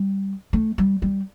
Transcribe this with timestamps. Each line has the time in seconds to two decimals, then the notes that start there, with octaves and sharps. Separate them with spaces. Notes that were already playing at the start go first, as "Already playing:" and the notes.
Already playing: G3
0.53 A3
0.78 G3
1.02 G3